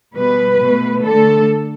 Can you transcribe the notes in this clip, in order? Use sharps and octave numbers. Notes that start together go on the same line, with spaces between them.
B2 G3 B4
B2 A3
D3 A3 A4